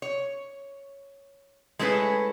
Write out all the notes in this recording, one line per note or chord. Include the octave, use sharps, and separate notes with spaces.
C#5
G#3 A3 C#4 E4 G#4 B4